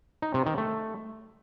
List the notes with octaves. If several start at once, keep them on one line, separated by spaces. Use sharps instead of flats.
D#4
C3
D#3
A3